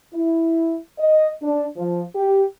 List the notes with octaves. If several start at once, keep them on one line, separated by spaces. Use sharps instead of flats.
E4
D#5
D4
F3
G4